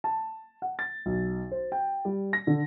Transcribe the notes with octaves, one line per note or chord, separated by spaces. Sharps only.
A5
F#5
A6
B1
C5
G5
G3
A#6
D3